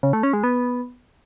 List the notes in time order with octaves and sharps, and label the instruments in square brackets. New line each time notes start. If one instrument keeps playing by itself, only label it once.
[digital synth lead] C#3
A3
C#4
G#3
B3